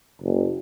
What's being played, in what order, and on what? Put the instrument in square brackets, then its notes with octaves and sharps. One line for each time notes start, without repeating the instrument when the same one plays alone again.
[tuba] F#1